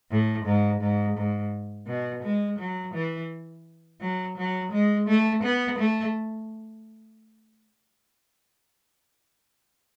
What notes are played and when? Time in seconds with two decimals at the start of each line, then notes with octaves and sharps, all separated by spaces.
0.11 A2
0.45 G#2
0.81 G#2
1.17 G#2
1.87 B2
2.23 G#3
2.59 F#3
2.94 E3
4.00 F#3
4.37 F#3
4.72 G#3
5.07 A3
5.43 B3
5.78 A3